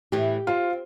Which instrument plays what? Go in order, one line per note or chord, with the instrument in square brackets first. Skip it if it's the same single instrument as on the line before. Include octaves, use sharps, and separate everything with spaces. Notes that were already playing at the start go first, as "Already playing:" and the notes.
[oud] A2 E3 [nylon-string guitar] G4
[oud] C4 [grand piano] F4